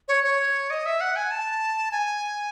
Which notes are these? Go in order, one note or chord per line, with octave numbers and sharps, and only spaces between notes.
C#5
C#5
D#5
E5
F#5
G#5
A5
G#5